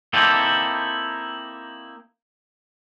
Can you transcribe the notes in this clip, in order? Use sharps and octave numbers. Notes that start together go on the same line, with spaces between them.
A#3 C4 D#4 E4 G4 A4